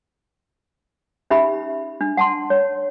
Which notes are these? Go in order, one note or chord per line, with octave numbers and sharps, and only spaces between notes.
C#4 D#4 G4 E5 B5
D4
F#5 A5 C6
C#5